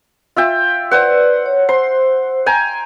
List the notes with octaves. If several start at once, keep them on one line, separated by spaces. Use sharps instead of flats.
F4 E5 G5
B4 C5 D5 F#5
C#5
C5 C6
G5 G#5 A#5